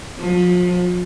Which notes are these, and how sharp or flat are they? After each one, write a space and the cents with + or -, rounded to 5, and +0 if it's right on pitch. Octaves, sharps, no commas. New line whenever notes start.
F3 +35